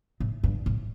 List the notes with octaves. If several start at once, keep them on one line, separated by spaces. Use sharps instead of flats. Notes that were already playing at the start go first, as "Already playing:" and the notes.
A2
G2
A2